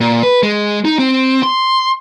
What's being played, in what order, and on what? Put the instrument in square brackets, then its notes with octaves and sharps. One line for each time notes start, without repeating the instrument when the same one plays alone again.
[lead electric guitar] A#2
B4
G#3
D#4
C4
C6